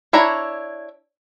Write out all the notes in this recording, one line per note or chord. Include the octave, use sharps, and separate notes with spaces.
D4 E4 C#5 A#5